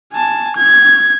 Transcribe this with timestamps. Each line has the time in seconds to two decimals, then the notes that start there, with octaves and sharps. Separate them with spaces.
0.14 G#5 A5
0.57 G#6